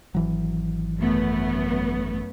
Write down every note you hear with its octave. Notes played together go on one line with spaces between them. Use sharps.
G#1 E3 F#3
F#2 A3 B3